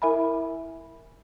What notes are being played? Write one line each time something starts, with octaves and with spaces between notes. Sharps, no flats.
E4 A#4 E5 G#5 B5